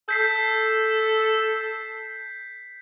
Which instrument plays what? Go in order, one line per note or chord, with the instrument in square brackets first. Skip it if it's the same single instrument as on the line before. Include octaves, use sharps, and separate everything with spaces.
[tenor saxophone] A4 [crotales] G6 B6 C7